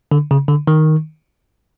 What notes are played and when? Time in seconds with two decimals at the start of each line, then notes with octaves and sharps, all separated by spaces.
0.12 D3
0.31 C#3
0.49 D3
0.67 D#3